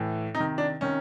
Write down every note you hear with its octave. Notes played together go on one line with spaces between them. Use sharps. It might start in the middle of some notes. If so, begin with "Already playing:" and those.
Already playing: A2 E3
C3 D#4
D#3
D4
C3 D#3 C#4